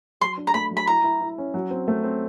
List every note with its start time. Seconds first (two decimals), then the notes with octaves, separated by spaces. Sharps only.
0.21 F#3 C6
0.37 D4
0.47 A#5
0.54 A3 B5
0.71 F#3
0.77 B5
0.87 E4 A#5
1.04 E4
1.21 E4
1.38 C#4
1.54 F#3
1.71 C4
1.88 A3
2.04 C4